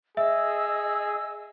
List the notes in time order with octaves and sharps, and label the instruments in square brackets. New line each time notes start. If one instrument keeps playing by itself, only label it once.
[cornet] G#4 [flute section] D#5 E6 [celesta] E5